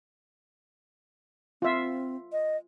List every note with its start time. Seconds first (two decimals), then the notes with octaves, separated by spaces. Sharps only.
1.62 C4 F4 E5
2.32 D#5